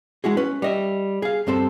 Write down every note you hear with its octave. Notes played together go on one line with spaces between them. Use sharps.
G#3 E4 F#4 G#4
C#4 B4
G3 D#5 E5
G#4 F5
G2 C4 A4 C5